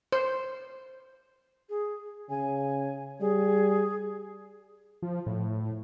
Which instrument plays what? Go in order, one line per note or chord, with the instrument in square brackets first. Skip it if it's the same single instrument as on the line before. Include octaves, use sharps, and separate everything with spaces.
[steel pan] C5
[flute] G#4
[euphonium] C#3 [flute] G#5
[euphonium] G3 [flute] G#4
[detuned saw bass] F3
A2